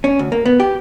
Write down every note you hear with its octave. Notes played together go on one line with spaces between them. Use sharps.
C#4
D2
A#3
B3
G4